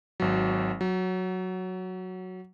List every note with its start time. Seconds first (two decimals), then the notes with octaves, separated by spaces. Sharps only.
0.20 G#1 F#3
0.81 F#3